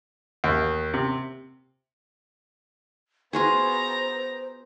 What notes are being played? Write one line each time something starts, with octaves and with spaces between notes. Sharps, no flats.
D#2
C3
B3 F4 F#4 G#4 C5 A#5